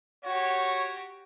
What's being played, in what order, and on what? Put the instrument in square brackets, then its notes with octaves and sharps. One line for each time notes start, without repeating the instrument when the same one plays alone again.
[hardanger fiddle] F#4 G4 [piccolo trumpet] C#5